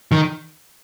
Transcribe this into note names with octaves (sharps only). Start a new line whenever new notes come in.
D#3